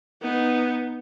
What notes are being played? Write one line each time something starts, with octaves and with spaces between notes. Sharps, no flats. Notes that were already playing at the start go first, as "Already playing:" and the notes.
B3 D#4